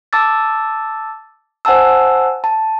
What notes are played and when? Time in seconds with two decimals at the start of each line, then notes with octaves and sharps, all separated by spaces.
0.13 A5 D6 E6 A6
1.65 C5 F#5 G#5 A5 E6
2.44 A5